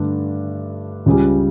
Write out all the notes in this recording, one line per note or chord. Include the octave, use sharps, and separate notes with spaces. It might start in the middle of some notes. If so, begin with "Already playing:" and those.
Already playing: G2 D3 A3 D4
C#2 C#3 G3